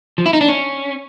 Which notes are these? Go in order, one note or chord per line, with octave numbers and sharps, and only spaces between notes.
F3
E4
D#4
D4
C#4